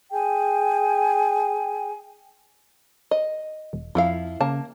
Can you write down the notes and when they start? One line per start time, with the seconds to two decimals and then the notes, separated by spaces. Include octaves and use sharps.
0.11 G#4 G5 G#5
3.11 D#5
3.73 E1
3.95 F2 F3 E4 F5
4.40 C#3 A#3 A5